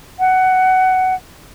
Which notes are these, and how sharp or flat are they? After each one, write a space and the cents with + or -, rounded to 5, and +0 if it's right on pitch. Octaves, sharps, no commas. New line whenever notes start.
F#5 +15